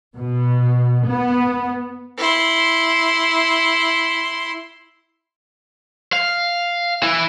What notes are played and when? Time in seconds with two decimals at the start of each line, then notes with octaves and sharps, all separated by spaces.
0.15 B2
1.06 B3
2.17 E4 C6
6.13 F5
7.03 E3 E4